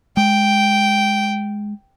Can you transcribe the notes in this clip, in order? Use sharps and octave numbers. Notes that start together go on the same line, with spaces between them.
G#3 G5